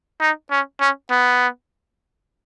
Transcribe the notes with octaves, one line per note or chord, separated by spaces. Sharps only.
D#4
C#4
C#4
B3